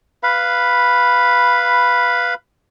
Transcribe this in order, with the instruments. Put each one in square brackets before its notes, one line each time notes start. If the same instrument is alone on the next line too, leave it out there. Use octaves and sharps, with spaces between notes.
[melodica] B4 F5 B5